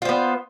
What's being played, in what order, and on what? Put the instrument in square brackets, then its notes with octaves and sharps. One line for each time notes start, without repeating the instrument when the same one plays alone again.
[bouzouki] F4
C5
B3